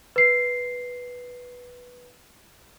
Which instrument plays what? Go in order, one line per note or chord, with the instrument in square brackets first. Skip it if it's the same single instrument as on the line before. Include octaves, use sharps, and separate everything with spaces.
[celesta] B4 C7